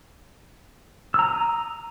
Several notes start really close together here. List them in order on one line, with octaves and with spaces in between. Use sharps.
E6 A#5 D#6